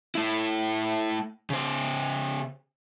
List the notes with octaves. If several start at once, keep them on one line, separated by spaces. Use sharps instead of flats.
A3 E4
C#3 C5